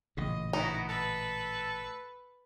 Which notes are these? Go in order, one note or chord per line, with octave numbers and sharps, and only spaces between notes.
A1 A#2 C#3 D#5
B3 D#4 E4 F#4
A4 B4